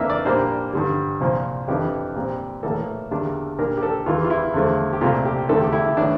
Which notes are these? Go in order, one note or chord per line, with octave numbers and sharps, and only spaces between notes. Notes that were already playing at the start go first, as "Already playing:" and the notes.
Already playing: F2 E3 A#3 D4 E5
D5
A#2 G3 A#3 D4 C5
G2 D3 G3
C2 A#2 F3
F2 E3 G3 D4 G4
A#2 G3 C4
A#1 A2 E3 A#3 A4
E2 D3 G3 A#3 D4
A#2 G3 D4 A#4
G4
A4
E2 E3 G3 F4
F4
E4
E2 D3 F3 A3
G4
C2 A#2 A3 C4 F4
G4
E2 D3 A3 D4 A4
G4
E4
E4
A2 E3 D4